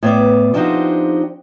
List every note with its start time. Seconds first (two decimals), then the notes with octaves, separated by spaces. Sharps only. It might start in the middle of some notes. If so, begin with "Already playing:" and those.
0.03 A2 B3 D5
0.54 F3 C4 D4 D#4 F#4 G4